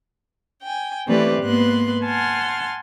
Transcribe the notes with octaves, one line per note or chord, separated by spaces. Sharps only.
G5 G#5
E3 A3 C4 G4 B4 D5
G#2 A#3 B3 B4 C6 F#6
F#5 G#5 A5 C6 F6